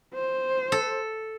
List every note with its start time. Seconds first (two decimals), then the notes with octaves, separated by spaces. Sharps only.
0.14 C5
0.72 A4